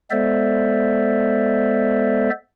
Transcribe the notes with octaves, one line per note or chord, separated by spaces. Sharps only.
G#3 B3 A4 C5 D5 E5